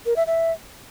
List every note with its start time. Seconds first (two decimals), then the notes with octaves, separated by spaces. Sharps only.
0.06 A#4
0.16 E5
0.27 E5